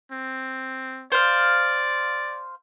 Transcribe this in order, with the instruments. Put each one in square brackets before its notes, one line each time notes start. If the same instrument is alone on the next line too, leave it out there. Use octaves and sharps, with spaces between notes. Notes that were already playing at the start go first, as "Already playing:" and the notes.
[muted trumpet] C4
[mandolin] C5 F5 [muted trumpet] D5